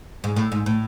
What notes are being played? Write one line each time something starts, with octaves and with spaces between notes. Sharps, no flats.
G#2
A2
G#2
A2